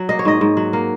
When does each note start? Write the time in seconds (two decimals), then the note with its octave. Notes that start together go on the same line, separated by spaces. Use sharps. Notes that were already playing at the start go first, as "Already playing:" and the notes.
Already playing: F#3
0.09 A#3 D#5
0.19 C#5
0.25 G#2 D#5
0.41 G#2
0.57 F#3
0.73 A#3